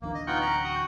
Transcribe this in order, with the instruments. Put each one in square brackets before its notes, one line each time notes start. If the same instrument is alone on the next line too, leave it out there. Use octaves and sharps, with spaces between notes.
[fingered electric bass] D1 E3 D4 [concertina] A#3
[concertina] D#5
[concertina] B3 D#4 F4 [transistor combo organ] F#5 G5 C#6
[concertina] C#4 A#5
F#4 D#6